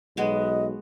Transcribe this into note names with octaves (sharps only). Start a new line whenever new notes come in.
B1 G#3 B3 F#4 D#5